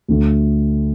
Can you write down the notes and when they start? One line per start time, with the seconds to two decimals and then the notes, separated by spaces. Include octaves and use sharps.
0.08 D2 D3 A3